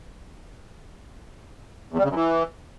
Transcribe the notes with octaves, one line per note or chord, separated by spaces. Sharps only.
E2
G3
C#3
F#2
E3